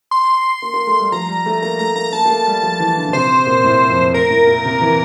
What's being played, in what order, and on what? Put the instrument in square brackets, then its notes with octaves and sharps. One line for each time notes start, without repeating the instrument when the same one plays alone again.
[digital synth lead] C6
[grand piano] A#3
A#3
A3
G3
[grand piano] F3 [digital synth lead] A#5
[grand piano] G3
A3
[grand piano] A#3 [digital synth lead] A#5
[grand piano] A3 [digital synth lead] A#5
[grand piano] A#3 [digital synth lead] A#5
[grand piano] A#3 [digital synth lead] A5
[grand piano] A#3
A3
G3
F3
E3
D3
A#2
[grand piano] C3 [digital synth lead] C5
[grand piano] A#2
A2
F2
[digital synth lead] A#4
[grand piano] A2
A#2
C3
E3